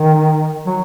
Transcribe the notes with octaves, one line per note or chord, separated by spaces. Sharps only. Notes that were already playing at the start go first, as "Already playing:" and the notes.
Already playing: D#3
F#3